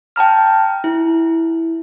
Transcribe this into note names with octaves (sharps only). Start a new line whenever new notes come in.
G5 A5 A#5 F6
E4